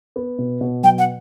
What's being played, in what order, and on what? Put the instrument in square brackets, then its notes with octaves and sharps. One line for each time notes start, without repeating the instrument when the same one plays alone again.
[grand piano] B3
B2
B2
[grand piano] F#3 [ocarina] G5
[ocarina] F#5